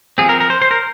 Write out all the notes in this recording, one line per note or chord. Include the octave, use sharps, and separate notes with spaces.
F3 C4 G#4
A#4
A#4
C5
C5
A#4